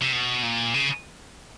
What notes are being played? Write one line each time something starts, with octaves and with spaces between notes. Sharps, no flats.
C3
B2
A#2
C#3